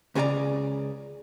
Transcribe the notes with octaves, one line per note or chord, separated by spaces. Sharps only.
C#2 C#3 G#4 A4 D5 A#5